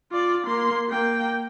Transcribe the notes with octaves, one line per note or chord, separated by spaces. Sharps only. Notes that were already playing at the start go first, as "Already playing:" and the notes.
F4 D5
A#3 C6
A#3 G5